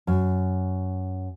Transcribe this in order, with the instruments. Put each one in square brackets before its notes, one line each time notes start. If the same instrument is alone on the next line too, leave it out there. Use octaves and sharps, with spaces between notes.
[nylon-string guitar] F#2